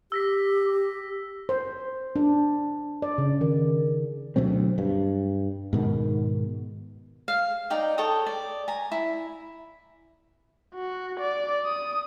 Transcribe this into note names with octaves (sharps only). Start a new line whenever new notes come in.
G4 E6 A#6 B6
C5
D4
D5
C#3
D#3
D2 B2 F#3 C4
G2
G#2 B2 D#3
F5
D#4 D5 G5
A4 C#5 G5 D#6
D5
G#5 A#5
E4
F#4
D5
D#6